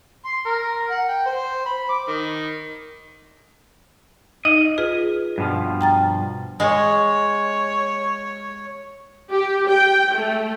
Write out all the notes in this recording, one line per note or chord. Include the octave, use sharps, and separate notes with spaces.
C6
A#4
F#5
G5
C5
B5
D6
D#3
D#4 D#5
F4 G#4 B4
G2 B2 F3
G5 A#5 A6
G#3 C#5
G4
G5
A3